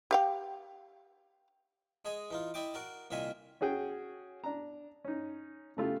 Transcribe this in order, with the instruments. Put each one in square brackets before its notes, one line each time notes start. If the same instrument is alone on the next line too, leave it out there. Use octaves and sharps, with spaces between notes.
[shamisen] G4 F5 G5
[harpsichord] G#3 G#4 D#5 G#5
E3 D#4 F4
E4 D5 D#5 G5 D6
F#4 A#4 D5
C2 A#2 D#3 E5 F5 G#5
[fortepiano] C#4 F#4 G#4 G5
D4 A#5
C#4 D#4
C#3 A3 F4 G4